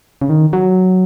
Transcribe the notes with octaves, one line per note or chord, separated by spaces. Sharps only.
C#3
D#3
F#3